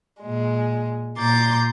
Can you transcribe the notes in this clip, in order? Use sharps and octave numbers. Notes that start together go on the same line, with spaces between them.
A#2 G#3
A#2 A#5 C6 D6 G6 A6